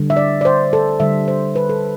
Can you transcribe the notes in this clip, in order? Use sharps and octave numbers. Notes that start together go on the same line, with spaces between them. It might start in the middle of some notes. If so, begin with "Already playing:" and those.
Already playing: D3 G3
E5
D5
D5
C5
A4
D3 G3 E5
C5
B4
A4